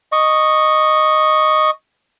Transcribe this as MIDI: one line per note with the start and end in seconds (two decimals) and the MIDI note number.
0.12 1.71 75
0.12 1.71 85